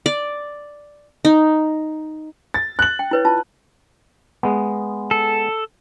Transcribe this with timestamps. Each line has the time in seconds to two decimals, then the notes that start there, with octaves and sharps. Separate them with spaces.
0.06 D5
1.25 D#4
2.54 A6
2.79 F#6 F#7
2.99 G5
3.11 E4 B4 C#5
3.25 F4 A5
4.43 G#3 B3
5.11 A4